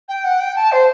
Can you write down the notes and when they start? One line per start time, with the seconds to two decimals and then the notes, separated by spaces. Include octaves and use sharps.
0.08 G5
0.24 F#5
0.40 G5
0.55 A5
0.71 C5